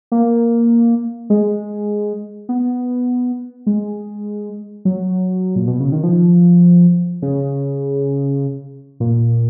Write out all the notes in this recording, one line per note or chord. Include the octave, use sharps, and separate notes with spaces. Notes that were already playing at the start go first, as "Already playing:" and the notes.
A#3
G#3
B3
G#3
F#3
A#2
B2
C#3
D#3
F3
C#3
A#2